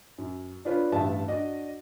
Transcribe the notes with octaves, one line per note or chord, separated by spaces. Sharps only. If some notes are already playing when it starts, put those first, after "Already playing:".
F#2
D4 F4 B4 C#5
A1 G2 E5 A5
D4 F#4 D5 D#5